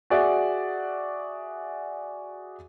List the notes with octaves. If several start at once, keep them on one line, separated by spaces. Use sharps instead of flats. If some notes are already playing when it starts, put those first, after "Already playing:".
F#4 G#4 D5 E5 F#5